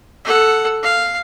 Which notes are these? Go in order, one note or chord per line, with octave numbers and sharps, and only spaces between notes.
A4 F#5
F5